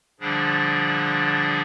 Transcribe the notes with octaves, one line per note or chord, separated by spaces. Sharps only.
A#2 D3 F3 G3 D4 G#4